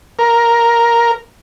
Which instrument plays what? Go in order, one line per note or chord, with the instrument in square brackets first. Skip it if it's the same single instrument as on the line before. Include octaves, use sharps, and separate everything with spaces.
[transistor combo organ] A#4